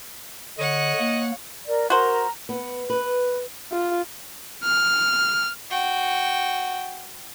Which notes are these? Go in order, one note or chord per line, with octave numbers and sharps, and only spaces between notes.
D3 C#5 D#5 F#5
A#3
A#4 D5
F#4 A#4 C5 A#5
B3
B4
F4
F6
F#4 G5